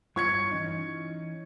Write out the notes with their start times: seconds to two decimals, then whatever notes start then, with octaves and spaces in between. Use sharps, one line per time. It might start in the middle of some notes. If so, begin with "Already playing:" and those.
0.16 G2 F4 C#5 C#6 G#6 C#7
0.52 E3 C#4 D#4